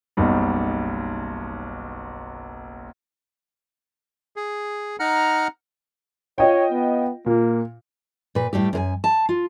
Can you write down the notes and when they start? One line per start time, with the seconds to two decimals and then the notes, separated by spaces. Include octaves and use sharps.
0.17 F#1 B1 G3 D#4
4.36 G#4
5.00 D#4 F#5 A#5 F6
6.38 F4 C#5 D#5 G5
6.72 B3
7.26 A#2 A#3
8.35 A#2 B4
8.53 A2 G3 A3 G4
8.73 F#2 A#4 G#5
9.04 A5
9.29 F4